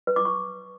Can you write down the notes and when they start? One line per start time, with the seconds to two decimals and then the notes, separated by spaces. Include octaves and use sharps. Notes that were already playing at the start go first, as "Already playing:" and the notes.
0.07 B4
0.16 D6
0.25 C#6